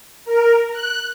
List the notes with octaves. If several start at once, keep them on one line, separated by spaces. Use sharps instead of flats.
A#4
F#6